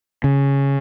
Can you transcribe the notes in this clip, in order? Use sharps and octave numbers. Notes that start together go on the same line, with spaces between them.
C#3